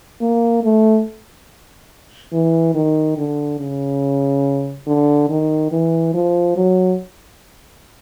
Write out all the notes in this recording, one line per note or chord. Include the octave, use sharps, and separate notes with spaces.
A#3
A3
E3
D#3
D3
C#3
D3
D#3
E3
F3
F#3